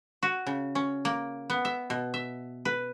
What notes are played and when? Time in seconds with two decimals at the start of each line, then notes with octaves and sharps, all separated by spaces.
0.23 F#4
0.47 C#3
0.75 C#4
1.05 A#3
1.50 B3
1.65 E5
1.90 B2
2.14 E5
2.65 B4